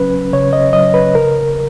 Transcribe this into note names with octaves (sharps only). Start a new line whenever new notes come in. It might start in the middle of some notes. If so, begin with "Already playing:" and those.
Already playing: C#3 F#3 C#4 B4
C#3 C#5
D#5
F#3 D#5
B4
C#3 A#4